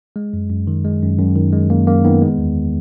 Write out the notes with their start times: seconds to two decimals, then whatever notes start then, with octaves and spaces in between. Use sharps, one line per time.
0.16 G#3
0.33 F#2
0.50 F#2
0.67 D#3
0.84 G#3
1.02 F#2
1.19 F#2
1.35 D#3
1.53 G#3
1.70 F#2 A#3
1.87 F#2 A#3
2.05 D#3 B3
2.22 G#3
2.38 E2